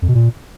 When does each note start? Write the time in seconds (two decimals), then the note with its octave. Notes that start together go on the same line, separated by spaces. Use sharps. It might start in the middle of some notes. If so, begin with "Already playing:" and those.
0.02 F2
0.08 B2
0.15 A#2